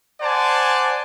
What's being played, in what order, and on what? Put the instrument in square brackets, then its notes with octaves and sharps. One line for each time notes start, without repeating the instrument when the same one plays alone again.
[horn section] C5 D5 F#5 G#5 A5